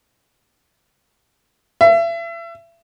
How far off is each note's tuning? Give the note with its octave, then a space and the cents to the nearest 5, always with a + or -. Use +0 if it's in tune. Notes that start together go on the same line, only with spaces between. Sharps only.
E5 +35